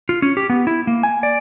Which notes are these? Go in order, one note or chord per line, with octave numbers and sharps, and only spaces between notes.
F4
C#4
G4
B3
E4
A#3
G#5
D5